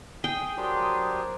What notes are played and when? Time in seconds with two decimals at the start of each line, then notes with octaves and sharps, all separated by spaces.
0.24 G#4 G5
0.57 F#3 D4 G4 A#4 C5